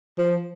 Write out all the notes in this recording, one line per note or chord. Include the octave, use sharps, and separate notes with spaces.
F3